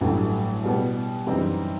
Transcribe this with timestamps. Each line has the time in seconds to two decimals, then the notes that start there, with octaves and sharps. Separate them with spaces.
0.01 A1 G2 F#3 A3
0.64 B2 G3 B3
1.26 F#2 E3 G3 C4 D#4